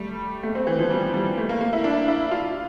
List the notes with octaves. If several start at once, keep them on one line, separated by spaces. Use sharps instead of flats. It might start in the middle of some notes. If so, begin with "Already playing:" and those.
Already playing: G3 A3
A3
C4
E3
F3
G3
G3
A3
A#3
A#3
E4
D4
E4
F4